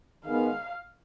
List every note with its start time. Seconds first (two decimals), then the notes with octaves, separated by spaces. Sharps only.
0.24 D#3 G#3 B3 F5